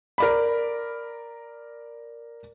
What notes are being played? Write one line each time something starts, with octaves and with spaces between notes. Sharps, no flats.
A#4 D5 B5